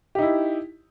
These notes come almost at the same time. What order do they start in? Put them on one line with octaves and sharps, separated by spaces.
G4 D#4 E4